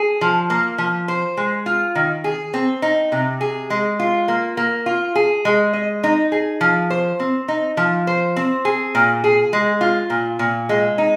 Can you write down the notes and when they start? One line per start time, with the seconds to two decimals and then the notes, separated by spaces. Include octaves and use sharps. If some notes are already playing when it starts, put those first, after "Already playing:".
Already playing: G#4
0.21 F3
0.50 A#3
0.78 F3
1.08 C5
1.37 G#3
1.66 F4
1.95 D#3
2.24 G#4
2.54 C4
2.82 D#4
3.12 C3
3.41 G#4
3.70 G#3
4.00 F4
4.28 A#3
4.57 A#3
4.86 F4
5.15 G#4
5.45 G#3
5.73 D#5
6.04 D#4
6.32 G#4
6.61 F3
6.90 C5
7.20 C4
7.48 D#4
7.77 F3
8.07 C5
8.36 C4
8.65 G#4
8.95 A#2
9.24 G#4
9.53 G#3
9.81 F4
10.10 A#2
10.39 A#2
10.69 G#3
10.98 D#4